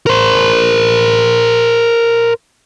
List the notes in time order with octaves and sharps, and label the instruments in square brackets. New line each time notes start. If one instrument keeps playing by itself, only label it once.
[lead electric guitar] A#4 C5